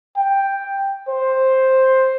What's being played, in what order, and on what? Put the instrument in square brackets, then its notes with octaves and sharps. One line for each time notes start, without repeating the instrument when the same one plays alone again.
[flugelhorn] G5
C5